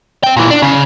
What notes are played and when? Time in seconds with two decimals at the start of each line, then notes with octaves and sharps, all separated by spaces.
0.23 C4 G5
0.36 A#2 E3
0.50 D4
0.62 C#3